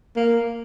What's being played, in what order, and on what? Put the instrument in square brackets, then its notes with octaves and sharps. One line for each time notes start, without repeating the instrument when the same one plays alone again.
[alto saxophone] A#3